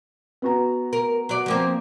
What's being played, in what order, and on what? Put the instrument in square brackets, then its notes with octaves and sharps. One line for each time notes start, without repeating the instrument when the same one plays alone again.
[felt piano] B3 F#4 A#5
[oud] A#4
F#3 D5
F3 A#3 C4